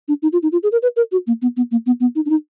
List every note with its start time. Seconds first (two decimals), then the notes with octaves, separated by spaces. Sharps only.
0.08 D4
0.22 D#4
0.33 F4
0.43 D#4
0.52 F4
0.63 G#4
0.72 A#4
0.83 B4
0.96 A#4
1.12 F#4
1.27 A#3
1.42 B3
1.57 B3
1.71 A#3
1.86 B3
2.00 B3
2.16 D#4
2.26 D4
2.30 D#4